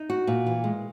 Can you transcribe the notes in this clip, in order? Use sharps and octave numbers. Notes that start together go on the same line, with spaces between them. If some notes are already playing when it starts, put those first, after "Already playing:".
Already playing: D#4
F#4
A#2
E3
G#3